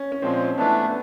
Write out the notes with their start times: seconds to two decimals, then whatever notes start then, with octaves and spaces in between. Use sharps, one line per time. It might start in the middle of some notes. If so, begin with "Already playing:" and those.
Already playing: C#4
0.12 C#4
0.22 A#2 F3 G#3 C4
0.58 E3 A3 B3 D4